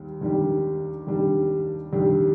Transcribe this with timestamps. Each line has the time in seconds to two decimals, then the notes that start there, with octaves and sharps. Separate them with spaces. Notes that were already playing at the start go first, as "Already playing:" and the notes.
Already playing: D#2 G3
0.21 D#2 D#3 G3 D4 G4
1.07 D#2 D#3 G3 D4 G4
1.92 D#2 D#3 G3 D4 G4